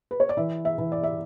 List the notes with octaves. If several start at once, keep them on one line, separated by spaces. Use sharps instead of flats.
B4
C#5
D5
E3 E5
E5
E3
D5
E5